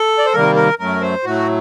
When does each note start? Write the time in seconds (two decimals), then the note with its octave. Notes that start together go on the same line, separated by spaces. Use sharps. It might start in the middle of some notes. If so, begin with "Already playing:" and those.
Already playing: A4
0.18 D5
0.26 C5
0.33 C3 D#3 G3 A#3 A#4
0.56 A#4
0.79 F#2 F#3 A3 A#4
1.01 C5
1.24 A2 F#3 A3 F#4